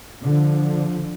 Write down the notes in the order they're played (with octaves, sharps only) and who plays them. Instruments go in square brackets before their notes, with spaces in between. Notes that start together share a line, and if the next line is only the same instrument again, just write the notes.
[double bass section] D3 F3